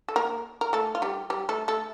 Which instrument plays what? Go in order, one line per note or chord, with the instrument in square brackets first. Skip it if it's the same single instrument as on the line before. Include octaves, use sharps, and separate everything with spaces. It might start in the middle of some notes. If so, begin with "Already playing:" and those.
[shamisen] A4
A#3 A#4
A#4
A3 A4
F4
G3 G4
G3 G4
A3 A4
A3 A4